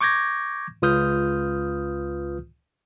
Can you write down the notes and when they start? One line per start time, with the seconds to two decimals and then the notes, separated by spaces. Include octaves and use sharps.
0.01 C#6 D6 G6 G#6 A#6
0.82 C#2 F4 B4 D#6 F6 G6